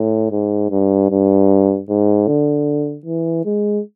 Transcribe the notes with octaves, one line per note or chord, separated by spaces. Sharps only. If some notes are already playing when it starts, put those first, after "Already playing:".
Already playing: A2
G#2
G2
G2
G#2
D3
E3
G#3